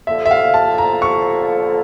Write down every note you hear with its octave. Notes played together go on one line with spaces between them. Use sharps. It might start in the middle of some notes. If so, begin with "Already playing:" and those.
D3 F3 A#3 E5
E5
F5
A5
A#5
C#6